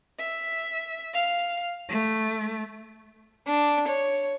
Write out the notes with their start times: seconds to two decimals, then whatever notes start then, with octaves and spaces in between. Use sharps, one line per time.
0.19 E5
1.14 F5
1.88 A3
3.47 D4
3.88 C#5